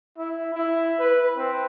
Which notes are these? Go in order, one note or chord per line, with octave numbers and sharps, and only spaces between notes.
E4
E4
B4
C4